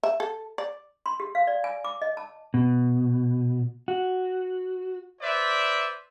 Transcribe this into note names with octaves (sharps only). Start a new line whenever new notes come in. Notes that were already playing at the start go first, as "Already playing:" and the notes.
E5
A4
D5
C6
G4
F5
D5
G#5
D6
D#5
A5
B2
F#4
B4 C5 D5 E5